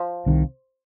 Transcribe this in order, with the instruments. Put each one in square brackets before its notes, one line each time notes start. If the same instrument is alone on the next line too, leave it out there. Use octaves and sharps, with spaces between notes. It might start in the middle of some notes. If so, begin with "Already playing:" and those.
Already playing: [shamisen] F3
[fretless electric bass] C2 C3 D#3